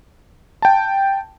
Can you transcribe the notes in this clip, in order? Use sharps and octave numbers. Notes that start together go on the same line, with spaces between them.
G5 A5